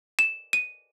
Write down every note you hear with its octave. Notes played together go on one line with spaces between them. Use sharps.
E7
D#7